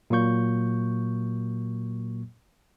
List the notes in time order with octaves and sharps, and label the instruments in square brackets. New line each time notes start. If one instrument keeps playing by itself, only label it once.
[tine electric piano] A#2 F#3 A#3 C#6 G6